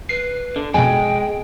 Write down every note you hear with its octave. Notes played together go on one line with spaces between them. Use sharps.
B4 C7
D3
F2 B2 G#3 G5 G#5